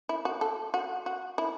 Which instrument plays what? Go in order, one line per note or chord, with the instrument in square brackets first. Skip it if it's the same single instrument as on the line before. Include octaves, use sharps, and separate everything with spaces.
[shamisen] E4
F#4
A4
F#4
F#4
E4